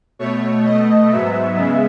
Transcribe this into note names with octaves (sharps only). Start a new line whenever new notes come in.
B2 A3 C#5
B2 A3 D#5
G#2 F#3 B3 E5
C#3 G#3 B3